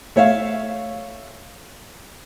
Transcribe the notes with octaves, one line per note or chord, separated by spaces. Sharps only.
A3 C#5 E5 F5